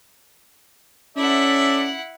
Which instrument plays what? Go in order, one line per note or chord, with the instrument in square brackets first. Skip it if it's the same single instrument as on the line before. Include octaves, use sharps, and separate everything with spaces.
[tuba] C#4 [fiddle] E4 F#5 [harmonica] A4 D5 E5